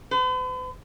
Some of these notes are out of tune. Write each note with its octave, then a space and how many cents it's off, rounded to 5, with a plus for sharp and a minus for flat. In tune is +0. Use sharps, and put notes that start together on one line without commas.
B4 +45